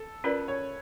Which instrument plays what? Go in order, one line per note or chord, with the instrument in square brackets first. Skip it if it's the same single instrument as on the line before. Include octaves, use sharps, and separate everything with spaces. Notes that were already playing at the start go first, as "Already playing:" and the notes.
Already playing: [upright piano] A4
[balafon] C#4 F4 A#4 D5 [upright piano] B4
[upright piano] C#5